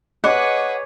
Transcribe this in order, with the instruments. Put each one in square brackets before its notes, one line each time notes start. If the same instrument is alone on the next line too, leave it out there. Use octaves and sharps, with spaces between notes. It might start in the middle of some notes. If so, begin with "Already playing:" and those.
[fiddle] G#4 B4 [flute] C#5 [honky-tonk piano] D#5 D6 [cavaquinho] F#5